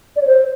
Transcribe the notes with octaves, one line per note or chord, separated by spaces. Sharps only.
D5
C#5
C5